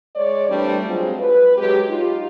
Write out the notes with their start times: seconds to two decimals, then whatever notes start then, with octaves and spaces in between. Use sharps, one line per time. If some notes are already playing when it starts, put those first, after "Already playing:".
0.16 G#3 C#5 D5
0.49 E3 G3 A3 C4 D4
0.86 F3 F#3 G#3 C4 F4
1.19 B4
1.57 F#3 G#3 G4
1.89 D#4 F4